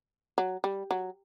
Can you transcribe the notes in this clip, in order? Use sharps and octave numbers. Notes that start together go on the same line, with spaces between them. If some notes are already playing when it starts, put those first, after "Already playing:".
F#3
G3
F#3